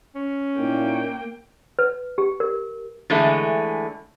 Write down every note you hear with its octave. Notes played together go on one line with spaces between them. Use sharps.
C#4
A#2 A#3 D#4 E4 G5
B4
G4
A#4
D3 E3 G#3 A3